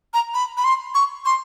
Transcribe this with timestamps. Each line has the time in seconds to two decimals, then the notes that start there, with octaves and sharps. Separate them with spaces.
0.14 A#5
0.34 B5
0.57 B5
0.64 C6
0.95 C#6
1.25 C6